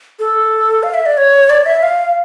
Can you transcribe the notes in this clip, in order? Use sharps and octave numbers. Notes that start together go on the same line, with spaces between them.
A4
F5
E5
D5
C#5
D5
E5
F5